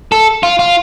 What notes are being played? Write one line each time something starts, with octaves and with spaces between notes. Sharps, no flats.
A4
F4
F4